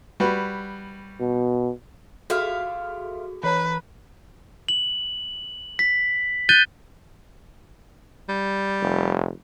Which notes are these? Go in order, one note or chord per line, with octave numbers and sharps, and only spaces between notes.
G3 F#4 B4
B2
F4 F#4 G#4 A4 E5 F5
E3 B4 C#5 A#5
F#7
B6
F#6 G6 A6 D#7 G7
G3
F1